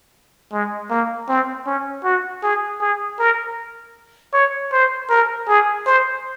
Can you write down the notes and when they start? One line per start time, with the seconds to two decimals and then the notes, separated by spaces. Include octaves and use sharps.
0.52 G#3
0.90 A#3
1.28 C4
1.67 C#4
2.04 F#4
2.43 G#4
2.81 G#4
3.19 A#4
4.33 C#5
4.73 C5
5.10 A#4
5.49 G#4
5.86 C5